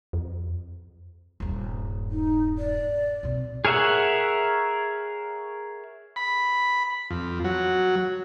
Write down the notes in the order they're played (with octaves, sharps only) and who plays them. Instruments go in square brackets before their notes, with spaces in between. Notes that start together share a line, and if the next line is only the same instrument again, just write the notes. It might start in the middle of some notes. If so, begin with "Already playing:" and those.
[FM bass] F2
[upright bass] D#1 G2
[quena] D#4
D5
[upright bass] B2 C4
[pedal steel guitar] G#4 A#4 C#5 E5 F#5
[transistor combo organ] B5
F2
F#3